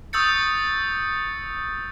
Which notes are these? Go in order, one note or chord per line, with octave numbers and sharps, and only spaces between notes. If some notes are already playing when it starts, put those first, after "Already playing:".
C#6 D#6 E6 G6 A6 C#7